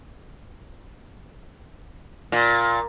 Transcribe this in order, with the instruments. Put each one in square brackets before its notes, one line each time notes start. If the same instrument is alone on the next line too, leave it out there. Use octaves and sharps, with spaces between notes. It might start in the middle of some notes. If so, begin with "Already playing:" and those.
[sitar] A#2